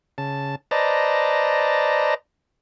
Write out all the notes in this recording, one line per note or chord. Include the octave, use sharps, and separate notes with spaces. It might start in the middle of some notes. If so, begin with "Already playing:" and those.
C#3 A5
B4 C5 D5 D#5 A5 A#5